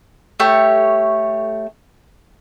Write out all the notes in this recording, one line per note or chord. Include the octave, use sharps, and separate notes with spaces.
A3 G4 C#5